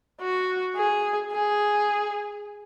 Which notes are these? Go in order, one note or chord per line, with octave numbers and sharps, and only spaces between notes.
F#4
G#4
G#4